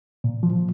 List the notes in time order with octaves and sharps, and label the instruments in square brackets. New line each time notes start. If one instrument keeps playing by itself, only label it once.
[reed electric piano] A#2
F3